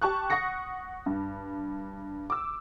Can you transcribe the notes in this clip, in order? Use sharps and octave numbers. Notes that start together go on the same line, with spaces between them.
G4 A5 C#6 F#6
F#5 C#6 D#6 A#6 C#7
G2
D6 E6